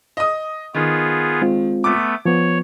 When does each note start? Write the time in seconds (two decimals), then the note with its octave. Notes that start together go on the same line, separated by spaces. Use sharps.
0.17 D#5 D#6
0.74 D#3 B3 F4 G#4
1.42 G#3 C4 F4
1.84 A3 B3 D6
2.25 F3 B3 C#5